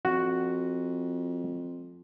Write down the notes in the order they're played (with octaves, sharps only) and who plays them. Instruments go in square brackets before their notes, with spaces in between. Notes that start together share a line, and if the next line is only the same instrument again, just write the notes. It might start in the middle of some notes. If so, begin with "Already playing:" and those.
[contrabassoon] F2 [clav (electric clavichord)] F#4